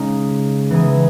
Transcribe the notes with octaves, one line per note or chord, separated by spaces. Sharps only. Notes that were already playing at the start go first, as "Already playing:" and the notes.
Already playing: C#3 G#3 D#4
E3 B3 D#4 G#4